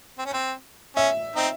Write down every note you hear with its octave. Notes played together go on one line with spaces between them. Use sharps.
C4
C#4
C4
C#4 E5
C4 D#4